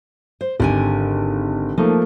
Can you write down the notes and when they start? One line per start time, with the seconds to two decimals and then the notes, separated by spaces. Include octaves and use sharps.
0.41 C5
0.60 G#1 D3 G4 G#5
1.78 F3 A3 A#3 D#4